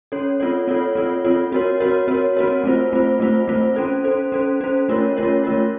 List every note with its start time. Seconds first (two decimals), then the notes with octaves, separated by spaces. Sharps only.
0.12 C#4 A4 C#5
0.40 C4 F4 A4 C#5
0.68 C4 F4 A4 C#5
0.95 C4 F4 A4 C#5
1.25 C4 F4 A4 C#5
1.52 C4 F#4 A#4 C#5
1.80 C4 F#4 A#4 C#5
2.08 C4 F#4 A#4 C#5
2.36 C4 F#4 A#4 C#5
2.64 A3 C4 F4 C5
2.93 A3 C4 F4 C5
3.20 A3 C4 F4 C5
3.48 A3 C4 F4 C5
3.76 C#4 A4 C5
4.04 C#4 A4 C5
4.32 C#4 A4 C5
4.61 C#4 A4 C5
4.89 A3 C#4 F4 A#4 C#5
5.17 A3 C#4 F4 A#4 C#5
5.44 A3 C#4 F4 A#4 C#5